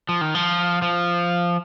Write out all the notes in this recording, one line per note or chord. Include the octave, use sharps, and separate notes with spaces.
F3
D#3
F3
F3